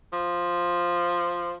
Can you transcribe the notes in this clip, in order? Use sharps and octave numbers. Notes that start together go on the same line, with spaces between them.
F3